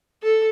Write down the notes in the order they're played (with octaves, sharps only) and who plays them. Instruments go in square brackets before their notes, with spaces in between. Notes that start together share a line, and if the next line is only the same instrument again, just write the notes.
[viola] A4